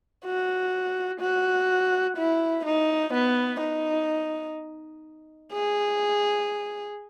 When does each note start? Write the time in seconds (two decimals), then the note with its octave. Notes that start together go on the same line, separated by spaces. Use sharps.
0.25 F#4
1.20 F#4
2.17 E4
2.66 D#4
3.14 B3
3.60 D#4
5.53 G#4